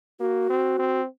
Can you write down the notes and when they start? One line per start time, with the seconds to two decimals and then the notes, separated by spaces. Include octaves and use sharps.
0.20 A#3 F#4
0.49 C4
0.79 C4